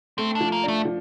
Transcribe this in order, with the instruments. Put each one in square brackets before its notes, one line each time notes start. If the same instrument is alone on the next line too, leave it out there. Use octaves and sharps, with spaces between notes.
[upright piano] A3 [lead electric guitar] C4
[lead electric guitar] D4
[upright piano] F3
[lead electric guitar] A#3
[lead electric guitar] A3 [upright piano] D4
[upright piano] F3